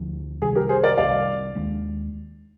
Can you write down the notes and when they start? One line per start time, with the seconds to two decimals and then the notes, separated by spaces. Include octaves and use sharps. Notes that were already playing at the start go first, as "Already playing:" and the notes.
Already playing: D2 D3 F3
0.42 C2 C3 D#3 G3 G#4
0.55 G4 A#4
0.69 G#4 C5
0.83 A#4 D5
0.97 C2 C3 D#3 G3 D5 F5
1.55 D#2 D#3 G#3 D4